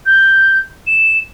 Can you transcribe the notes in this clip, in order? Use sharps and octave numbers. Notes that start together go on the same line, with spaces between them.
G6
E7